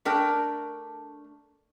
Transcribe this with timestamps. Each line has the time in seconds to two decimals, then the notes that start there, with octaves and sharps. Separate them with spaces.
0.05 A3 D4 A#4 G5